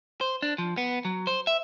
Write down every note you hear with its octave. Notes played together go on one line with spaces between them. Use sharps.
C5
D4
F3
B3
F#3
C5
E5